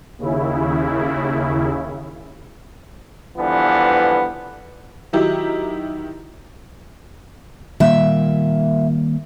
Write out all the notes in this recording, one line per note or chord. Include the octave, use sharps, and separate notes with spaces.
D#2 C#3 E4
D3 E3 F3 G3 B3
D#3 F#3 D#4 E4 G4
A#2 D#3 G3 A#3 E5